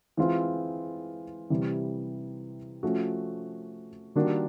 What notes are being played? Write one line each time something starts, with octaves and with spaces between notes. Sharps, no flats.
E3 G#3 C4 F4
C3 E3 G3
F3 A3 C#4 F#4
D#3 G3 A#3 D4 F#4